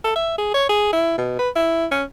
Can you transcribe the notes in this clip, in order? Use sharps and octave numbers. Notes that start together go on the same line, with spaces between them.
A4
E5
G#4
C#5
G#4
E4
B2
B4
E4
C#4